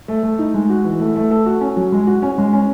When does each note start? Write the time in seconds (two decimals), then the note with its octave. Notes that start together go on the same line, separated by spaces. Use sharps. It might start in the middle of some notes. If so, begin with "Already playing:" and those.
0.08 A3
0.23 A3
0.39 D#4
0.54 G#3
0.69 F#4
0.84 E3
1.00 A3
1.16 A3
1.31 A4
1.46 F#4
1.61 C#4
1.77 F#3
1.92 G#3
2.07 F#4
2.22 C#4
2.38 G#3
2.53 C#4